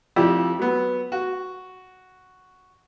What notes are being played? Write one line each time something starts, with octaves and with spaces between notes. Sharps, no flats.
F2 F3 E4 G4 D5
F#3 B3
F#4